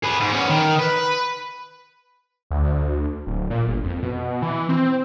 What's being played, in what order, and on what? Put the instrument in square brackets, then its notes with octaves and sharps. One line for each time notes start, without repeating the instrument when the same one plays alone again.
[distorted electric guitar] G#4 B4
G#2
B3 C#4
D#3
B4
[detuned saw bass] D2
D1
A#2
G1
F2
B2
E3
C4